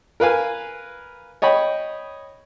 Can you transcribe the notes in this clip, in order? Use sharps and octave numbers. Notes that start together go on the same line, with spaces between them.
A#4 B4 F5 G#5
C#5 D#5 G5 B5